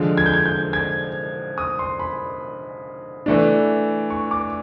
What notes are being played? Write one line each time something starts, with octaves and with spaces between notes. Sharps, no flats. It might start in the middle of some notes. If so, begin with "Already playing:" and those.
Already playing: D3 F3 G#3
G#6
G6
G#6
G6
G#6
D#6
C6
B5
E3 A3 D4
C#6
D6